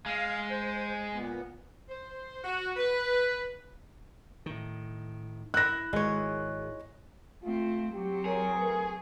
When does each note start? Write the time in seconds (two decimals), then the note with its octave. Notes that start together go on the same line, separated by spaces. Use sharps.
0.06 G#3 F5
0.50 C5
1.14 A#2 B3
1.89 C5
2.44 F#4
2.77 B4
4.46 A2 D#3
5.54 E4 E5 F#6 A#6
5.93 G#1 D#3 G#3 C#5
7.43 A3 C4 F4
7.93 F#3 C4 G4
8.25 G#4 A#4 C#5
8.56 A3 A#4 B4